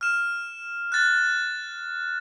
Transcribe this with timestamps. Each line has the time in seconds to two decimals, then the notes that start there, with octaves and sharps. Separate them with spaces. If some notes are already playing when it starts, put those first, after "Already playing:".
0.01 F6 E7
0.92 F#6 A6